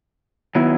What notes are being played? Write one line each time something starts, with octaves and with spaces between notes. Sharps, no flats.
D#3 F#3 B3 E4